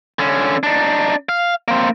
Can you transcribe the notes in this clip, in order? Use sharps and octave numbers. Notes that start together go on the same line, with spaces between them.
D3 C#4
D4 D#4
F5
A#3 C4